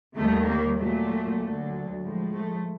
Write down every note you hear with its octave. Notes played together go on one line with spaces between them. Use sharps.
D#2 D#3 G3 A3
A#3
A#2 F#3 A3
D2 D3 F#3
A2 F3 G#3
A3